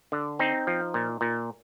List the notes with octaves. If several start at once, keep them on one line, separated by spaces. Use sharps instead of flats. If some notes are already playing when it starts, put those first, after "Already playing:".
D3
C4 D#4
F3
A#2
A#2